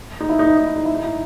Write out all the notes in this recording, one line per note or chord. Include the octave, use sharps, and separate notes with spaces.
D#4
E4
D#4
E4
D#4
E4
D#4
E4
D#4
E4